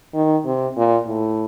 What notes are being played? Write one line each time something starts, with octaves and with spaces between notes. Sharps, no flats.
D#3
C3
A#2
A2